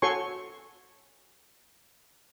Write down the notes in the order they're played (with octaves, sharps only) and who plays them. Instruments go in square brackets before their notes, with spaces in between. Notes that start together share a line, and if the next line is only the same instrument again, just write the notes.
[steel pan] F#4 A4 C#5 G#5 C6 C#6